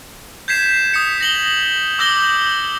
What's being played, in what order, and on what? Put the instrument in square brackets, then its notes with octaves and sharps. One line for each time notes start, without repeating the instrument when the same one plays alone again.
[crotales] G6 G#6 B6 C7 E7
D#6 B6 C#7
A#6 F#7 G7
D6 E6 G6 A#6 G7